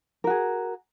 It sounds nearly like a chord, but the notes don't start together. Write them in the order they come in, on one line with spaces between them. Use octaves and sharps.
A#4 F#4 G#4